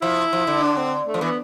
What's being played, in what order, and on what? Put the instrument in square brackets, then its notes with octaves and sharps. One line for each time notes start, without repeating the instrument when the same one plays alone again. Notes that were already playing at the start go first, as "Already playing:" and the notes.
[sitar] F3 [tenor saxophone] E4
[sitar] F3
D3
[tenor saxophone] D4
C4
A3
[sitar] F3
[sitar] E3 [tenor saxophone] B3